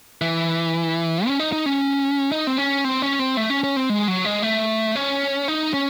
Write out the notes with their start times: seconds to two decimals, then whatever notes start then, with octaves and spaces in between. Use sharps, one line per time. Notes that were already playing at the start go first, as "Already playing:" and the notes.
0.21 E3
1.27 C#4
1.40 D#4
1.52 D#4
1.66 C#4
2.32 D#4
2.47 C4
2.58 C#4
2.84 C4
3.02 C#4
3.19 C4
3.37 A3
3.50 C#4
3.64 C#4
3.76 C4
3.90 G#3
4.08 F#3
4.25 G#3
4.43 A3
4.96 C#4
5.48 D#4
5.74 C#4